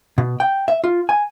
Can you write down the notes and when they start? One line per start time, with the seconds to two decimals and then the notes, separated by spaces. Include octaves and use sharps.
0.18 B2
0.40 G5
0.68 E5
0.84 F4
1.09 G#5